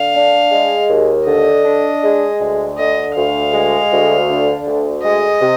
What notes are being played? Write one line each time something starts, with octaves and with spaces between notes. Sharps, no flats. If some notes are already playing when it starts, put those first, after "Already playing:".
Already playing: D3 F5
D4
G#3
D#2
D3 D#5
D4
G#3
D2
D3 D#5
D2 F5
G#3
D2
D3
D2
G#3 D#5
C3